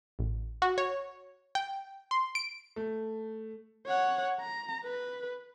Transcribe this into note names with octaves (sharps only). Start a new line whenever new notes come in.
A1
F#4
C#5
G5
C6
D7
A3
C#5 F#5
A#5
B4